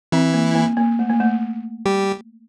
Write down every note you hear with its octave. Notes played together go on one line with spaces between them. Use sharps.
E3 C4 E4
A#3
A#3
A#3
A3
A#3
A3
G3 G4